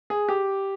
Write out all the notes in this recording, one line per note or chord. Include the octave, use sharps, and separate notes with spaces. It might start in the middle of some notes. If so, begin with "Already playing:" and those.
G#4
G4